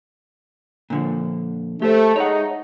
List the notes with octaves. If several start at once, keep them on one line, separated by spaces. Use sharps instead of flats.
A#2 D3 F3
A3 G4 C5
G#3 D#4 C#5 F#5